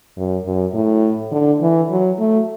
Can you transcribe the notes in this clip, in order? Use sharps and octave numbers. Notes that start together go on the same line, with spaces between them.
F#2
F#2
A2
D3
E3
F#3
A3